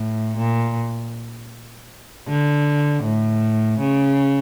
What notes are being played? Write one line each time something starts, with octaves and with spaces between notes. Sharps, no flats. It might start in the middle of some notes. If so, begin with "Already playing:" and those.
Already playing: A2
A#2
D3
A2
C#3